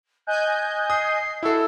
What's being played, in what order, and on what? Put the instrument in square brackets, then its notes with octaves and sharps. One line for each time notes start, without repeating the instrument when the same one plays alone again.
[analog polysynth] D#5 G#5 G6 [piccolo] F#6
[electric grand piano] D#6 [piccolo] C7
[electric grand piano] E4 A4 [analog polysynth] F#4 E5 [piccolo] E6